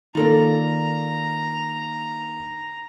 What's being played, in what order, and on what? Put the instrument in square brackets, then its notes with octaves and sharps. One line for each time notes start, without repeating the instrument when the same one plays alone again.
[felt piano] D#3 A#3 [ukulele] F4 A4 D5 [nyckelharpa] A#5